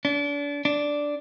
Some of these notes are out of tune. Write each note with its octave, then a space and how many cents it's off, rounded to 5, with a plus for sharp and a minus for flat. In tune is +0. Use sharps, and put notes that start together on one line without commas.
D4 -35
D4 -5